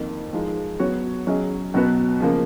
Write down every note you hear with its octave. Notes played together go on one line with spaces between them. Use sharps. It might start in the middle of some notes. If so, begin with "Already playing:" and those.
Already playing: F2 D#3 A#3
F3 G#3 D#4 A#4
F#3 B3 F#4 C#5
F#3 C#4 G#4 D#5
B2 F#3 B3 F#4 B4
C#3 F3 A#3